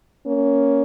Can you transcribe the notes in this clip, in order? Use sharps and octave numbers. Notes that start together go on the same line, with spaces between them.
A#3 C#4